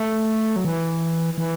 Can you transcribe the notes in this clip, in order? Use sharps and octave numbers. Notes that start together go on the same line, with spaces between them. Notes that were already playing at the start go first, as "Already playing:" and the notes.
Already playing: A3
F#3
E3
E3